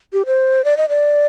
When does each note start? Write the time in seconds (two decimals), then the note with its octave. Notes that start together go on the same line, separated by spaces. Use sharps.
0.13 G4
0.26 C5
0.65 D5
0.77 D#5
0.89 D5